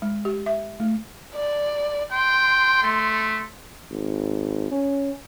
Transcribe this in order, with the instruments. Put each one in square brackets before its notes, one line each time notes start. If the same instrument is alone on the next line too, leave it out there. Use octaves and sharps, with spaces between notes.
[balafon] G#3
G4
E5
A3
[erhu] D5
[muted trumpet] G5 [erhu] C6
[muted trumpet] A3
[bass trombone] G#1
C#4